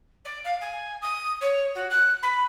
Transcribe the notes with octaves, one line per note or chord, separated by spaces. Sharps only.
D5
F5
G#5
D#6
C#5
F#4
F#6
B5